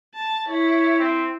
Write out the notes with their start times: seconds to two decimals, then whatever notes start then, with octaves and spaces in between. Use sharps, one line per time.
0.15 A5
0.49 E4 C#5
0.99 C4